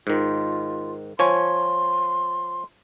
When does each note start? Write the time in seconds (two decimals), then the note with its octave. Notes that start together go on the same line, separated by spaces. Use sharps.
0.07 G#2 D#3 F4
1.19 F3 C#5 G#5 C6